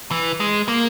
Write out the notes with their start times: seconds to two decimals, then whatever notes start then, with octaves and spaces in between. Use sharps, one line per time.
0.11 E3
0.40 G#3
0.68 A#3